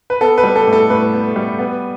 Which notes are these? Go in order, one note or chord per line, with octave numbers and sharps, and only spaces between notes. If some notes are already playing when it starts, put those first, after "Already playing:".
B4
B3 A4
B4
G3
A4
A2
A4
A2 B4
B3
G3
B3